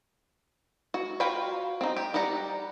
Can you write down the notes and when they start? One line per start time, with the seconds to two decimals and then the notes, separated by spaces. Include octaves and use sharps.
0.94 F#4
1.20 F4 F#4 F5 G5 B5
1.81 C4 D#4
1.96 G4
2.14 G3 D5 F#5 A#5